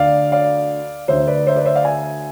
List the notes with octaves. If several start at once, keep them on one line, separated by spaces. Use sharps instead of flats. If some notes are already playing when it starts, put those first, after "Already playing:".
Already playing: D2 D3 D5 F5
D5 F5
D2 D3 C5 E5
B4 D5
C5 E5
B4 D5
C5 E5
D5 F5
E5 G#5